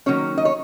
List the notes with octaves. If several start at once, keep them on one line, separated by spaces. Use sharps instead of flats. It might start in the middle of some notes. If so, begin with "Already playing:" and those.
D#3 F#3 A#3 C#4 C#5
D#5
C#5